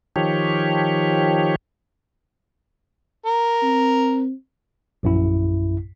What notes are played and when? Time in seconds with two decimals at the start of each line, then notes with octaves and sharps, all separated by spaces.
0.16 D#3 F3 G4 C#5
3.26 A#4
3.63 C4
5.03 A#1 F#2 E4